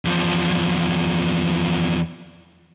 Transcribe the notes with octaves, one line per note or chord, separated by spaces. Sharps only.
E2 F3